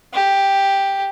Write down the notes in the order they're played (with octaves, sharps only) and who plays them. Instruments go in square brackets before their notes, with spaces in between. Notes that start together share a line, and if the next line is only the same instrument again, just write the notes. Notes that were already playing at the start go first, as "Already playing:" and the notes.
[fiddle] G4